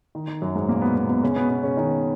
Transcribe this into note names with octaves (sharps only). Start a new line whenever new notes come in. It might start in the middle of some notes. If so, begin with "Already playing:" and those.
D#3
D#3
F#2 F#3
G#2 G#3
A#2 A#3
B2 B3
B2 B3
B2 B3
C#3 C#4
B2 B3
B2 B3
C#3 C#4
D#3 D#4